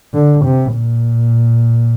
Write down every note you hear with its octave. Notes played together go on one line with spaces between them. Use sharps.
D3
C3
A#2